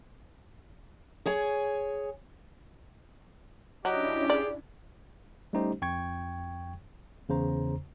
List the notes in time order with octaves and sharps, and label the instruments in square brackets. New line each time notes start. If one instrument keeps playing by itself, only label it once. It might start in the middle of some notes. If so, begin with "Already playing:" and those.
[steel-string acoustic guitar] G#4 C#5 G#5
[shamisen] F#3 [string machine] C#4 D4 E4 [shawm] G4 [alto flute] D#5
[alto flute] G#4 [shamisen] D5
[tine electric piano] G3 A3 C#4 D#4 G4 C5
F2 G5 C#6 G#6
E2 C#3 C5 A#5